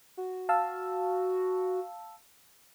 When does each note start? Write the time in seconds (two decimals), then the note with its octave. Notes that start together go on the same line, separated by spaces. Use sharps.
0.17 F#4
0.49 F5 A5 E6